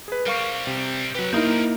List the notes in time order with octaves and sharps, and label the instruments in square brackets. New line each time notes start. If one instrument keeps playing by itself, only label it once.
[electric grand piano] G#4 B4
[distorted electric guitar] G3 C4 [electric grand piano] A#4 F5 C#6
[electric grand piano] C3
[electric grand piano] F#3 B4 [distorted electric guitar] G4 F#5
[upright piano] A#3 D#4 E4 [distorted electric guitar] C4 A#4 [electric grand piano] D#6 G6